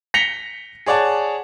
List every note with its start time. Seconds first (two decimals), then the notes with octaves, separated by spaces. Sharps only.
0.14 A#6 B6 C#7 F7 G7
0.86 G#4 C#5 D5 F#5 A5